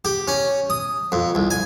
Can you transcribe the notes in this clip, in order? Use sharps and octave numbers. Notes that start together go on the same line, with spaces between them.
G4
C#4
D#6
F2
C2
G#5